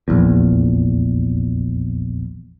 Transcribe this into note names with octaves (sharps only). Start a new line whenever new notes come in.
F1 A#1 E2